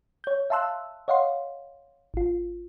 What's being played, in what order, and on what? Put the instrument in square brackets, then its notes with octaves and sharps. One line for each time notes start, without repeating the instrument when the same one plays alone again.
[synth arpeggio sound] C#5 G6
E5 F5 A5 C6 E6 F#6
C#5 D#5 F5 F#5 C6
G#1 F4